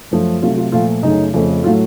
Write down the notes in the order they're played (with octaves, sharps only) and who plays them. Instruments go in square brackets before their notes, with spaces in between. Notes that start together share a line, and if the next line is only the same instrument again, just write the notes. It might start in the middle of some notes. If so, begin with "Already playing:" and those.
[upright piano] F#2 F3 A3
C3 F#3 A3 F4
F4
A#2 F3 A3 F4
F#2 C#3 A3 D#4
F2 C#3 F3 A3
A2 F#3 A3 F4